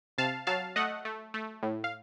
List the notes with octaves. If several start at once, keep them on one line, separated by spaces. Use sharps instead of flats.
C3 F5 A5
F#3 F5 A5
A3 D#5 F#5
A3
A3
A2
F5